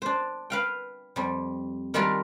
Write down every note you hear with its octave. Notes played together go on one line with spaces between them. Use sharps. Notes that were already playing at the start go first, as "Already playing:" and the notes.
D4 C5
B4 F5 G5
F2 G3
D#3 G3 D4 F4 G4 A#4